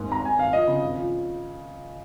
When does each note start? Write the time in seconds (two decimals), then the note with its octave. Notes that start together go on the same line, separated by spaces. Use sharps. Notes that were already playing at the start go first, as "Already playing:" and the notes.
Already playing: D#2 G#2
0.09 G#1 A#5
0.24 G#1 G#5
0.38 G#1 F5
0.52 F3 D#5
0.68 C#3
0.82 G#1
0.96 F3